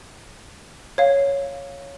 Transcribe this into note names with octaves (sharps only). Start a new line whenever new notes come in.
C#5 F5